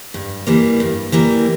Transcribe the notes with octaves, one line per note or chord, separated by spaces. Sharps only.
G2
E3 G3 A#3
G2
E3 G3 A#3